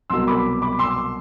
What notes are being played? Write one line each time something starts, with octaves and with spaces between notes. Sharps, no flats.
C2 B2 F#3 C6 E6
B5 D6
B5 D6
C6 E6